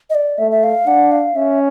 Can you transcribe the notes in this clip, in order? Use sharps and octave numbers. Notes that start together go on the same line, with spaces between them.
D#5
D5
A3 E5
E5
F5
D4 F#5
F5
C#4 E5